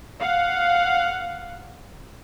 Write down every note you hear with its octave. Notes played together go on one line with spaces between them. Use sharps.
F5 F#5